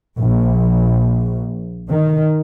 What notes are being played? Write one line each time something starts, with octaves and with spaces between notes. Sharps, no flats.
A#1
D#3